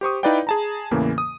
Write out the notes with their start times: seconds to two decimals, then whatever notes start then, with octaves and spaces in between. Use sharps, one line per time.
0.01 G4 C5 C#6 D#6
0.23 D#4 E4 B4 D5 F5 G5
0.47 G#4 A5 A#5
0.91 E2 A2 C#3 E3 A#3
1.18 D#6